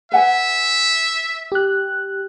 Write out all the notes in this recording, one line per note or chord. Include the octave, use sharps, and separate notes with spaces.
B4 E5 F#5 G#5
G4 F#6